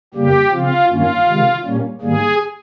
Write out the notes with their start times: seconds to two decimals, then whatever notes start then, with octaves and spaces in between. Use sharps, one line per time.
0.14 F2 C#3 G3 A#3 G4
0.52 C#3 F3 C4 F4
0.89 G2 D#3 A#3 C#4 F4
1.27 C3 D#3 G#3
1.64 A#2 G3 A#3 C#4
2.01 G#2 D#3 G3 A#3 G#4